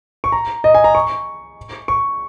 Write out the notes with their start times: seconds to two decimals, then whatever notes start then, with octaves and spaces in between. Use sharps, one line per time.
0.24 C#6
0.32 A#5
0.64 D#5
0.75 G#5
0.84 A#5
0.95 C#6
1.88 C#6